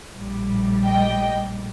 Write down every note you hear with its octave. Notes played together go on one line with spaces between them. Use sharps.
A#1 A2 G3
D#5 G5